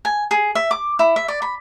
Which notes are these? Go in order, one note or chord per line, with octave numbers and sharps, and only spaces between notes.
G#5
G#4
E5
D6
E4
E5
D5
B5